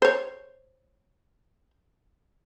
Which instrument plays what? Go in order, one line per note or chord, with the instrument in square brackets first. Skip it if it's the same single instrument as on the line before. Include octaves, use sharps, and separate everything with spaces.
[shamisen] C5 C#5